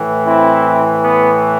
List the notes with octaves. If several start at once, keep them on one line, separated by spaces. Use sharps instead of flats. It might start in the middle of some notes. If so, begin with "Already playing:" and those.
Already playing: A2 E3
C4 E4
B3